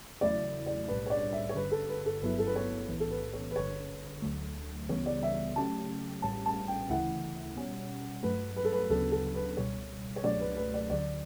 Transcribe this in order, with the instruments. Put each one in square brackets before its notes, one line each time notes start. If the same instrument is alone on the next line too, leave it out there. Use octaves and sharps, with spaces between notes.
[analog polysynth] E2 C#3 F#3 A3 E4 [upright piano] D5
[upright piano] D5
[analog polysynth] B1 A2 G3 D4 [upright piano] B4
[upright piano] C#5
D5
E5
C#5
[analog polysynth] G1 G2 D3 [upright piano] B4
[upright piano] A4
B4
A4
[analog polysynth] G1 G2 F#3 B3 E4 [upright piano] B4
[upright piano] A4
B4
C#5
[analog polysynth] B1 A2 E3 B3
[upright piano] A4
B4
C#5
B4
[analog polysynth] G1 G2 D3 [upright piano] C#5
[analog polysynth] D2 D3 F#3 A3
[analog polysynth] C#2 C#3 E3 G3 B3 [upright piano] C#5
[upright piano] D5
E5
[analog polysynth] C#3 F#3 A3 C#4 G4 [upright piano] A5
[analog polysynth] A1 A2 G3 C#4 [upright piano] A5
[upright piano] A5
G5
[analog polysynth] D2 C#3 E3 A3 E4 [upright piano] F#5
[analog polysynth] B2 G3 C#4
[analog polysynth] G2 F#3 A3 [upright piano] B4
[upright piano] B4
A4
B4
[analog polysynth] D2 C#3 F#3 B3 D4 [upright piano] A4
[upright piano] A4
B4
[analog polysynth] C#2 B2 G3 [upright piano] C#5
[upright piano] C#5
[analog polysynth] C#2 B2 F#3 A3 D4 [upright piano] D5
[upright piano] B4
B4
D5
[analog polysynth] D2 D3 F#3 [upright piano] D5